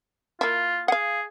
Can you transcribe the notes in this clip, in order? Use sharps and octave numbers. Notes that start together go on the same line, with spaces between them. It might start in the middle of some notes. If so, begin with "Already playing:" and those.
A#3 E4 F4
G#4 F5 F#5